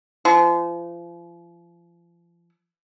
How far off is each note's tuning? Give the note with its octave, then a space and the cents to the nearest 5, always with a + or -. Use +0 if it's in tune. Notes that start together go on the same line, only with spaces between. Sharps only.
F3 -35